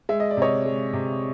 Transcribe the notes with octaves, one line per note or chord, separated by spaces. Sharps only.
G#3 E5
D#5
D5
C3 C#5 D#5
G#3
C3